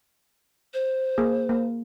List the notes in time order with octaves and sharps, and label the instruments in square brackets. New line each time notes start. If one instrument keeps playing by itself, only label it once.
[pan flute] C5
[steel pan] A#3 G#4
A#3